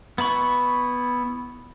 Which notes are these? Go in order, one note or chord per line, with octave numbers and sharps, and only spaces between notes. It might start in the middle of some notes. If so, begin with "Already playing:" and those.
B3 E4 B5 C#6